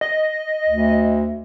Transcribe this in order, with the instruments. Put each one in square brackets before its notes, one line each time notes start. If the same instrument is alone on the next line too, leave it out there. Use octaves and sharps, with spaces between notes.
[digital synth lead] D#5
[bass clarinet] D2